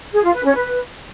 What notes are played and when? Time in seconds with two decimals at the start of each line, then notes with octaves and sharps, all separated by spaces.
0.13 G#4
0.23 F4
0.34 B4
0.44 C#4
0.54 B4